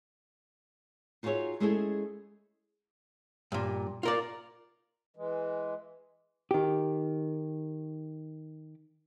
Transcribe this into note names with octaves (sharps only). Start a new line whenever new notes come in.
D#4 F4 F#4 G#4 C#5 E5
G#3 A3 C#4 E4 G#4 A4
G2 A#2
F4 A#4 D5
E3 G#3
D#3 G4